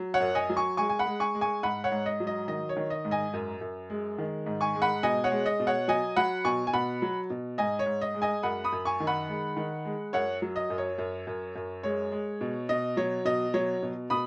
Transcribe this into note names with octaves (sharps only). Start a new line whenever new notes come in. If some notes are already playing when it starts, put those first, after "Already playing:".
Already playing: F#3
C#5 F#5
F#2
D#5 G#5
F#3
G#5 C#6
G#3 G#5 C#6
G#5
F#5 B5
G#3
G#5 C#6
G#3
G#5 C#6
G#2 F#5 B5
C#5 F#5
G#2
D#5
F#3
D#5
D#3 D#5
C#5
D#3
D#5
G#2
D#5 G#5
F#2
F#2
G#3
D#3
G#2
G#5 C#6
G#3
F#5 B5
B2 D#5 G#5
C#5 F#5
G#3
D#5
B2
C#5 F#5
F#3 D#5 G#5
F#3 F#5 B5
B2 G#5 C#6
G#5
B2 F#5 B5
F#3
B2
G#2 D#5 G#5
C#5
G#2
D#5
G#3
D#5 G#5
F#2 F#5 B5
B5 D#6
F#2
G#5 C#6
D#3
F#5 B5
G#3
D#3
G#3
F#2 C#5 F#5
F#3
D#5
F#2
C#5
F#2
F#2
F#2
G#3 C#5
G#3
B2
B2 D#5
F#3 C#5
B2 D#5
F#3 C#5
B2
B2 B5 D#6